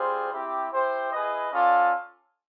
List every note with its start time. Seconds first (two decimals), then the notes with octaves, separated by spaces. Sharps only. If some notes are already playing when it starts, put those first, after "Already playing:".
Already playing: G3 C4 F4 G#4 C5
0.32 C4 E4 G4
0.72 E4 G4 C5
1.12 E4 G#4 B4 D#5
1.52 C#4 F4 A4 D5 F5